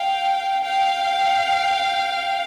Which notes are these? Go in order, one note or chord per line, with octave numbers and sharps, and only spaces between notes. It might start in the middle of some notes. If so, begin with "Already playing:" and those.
Already playing: F5 G5
F5 G5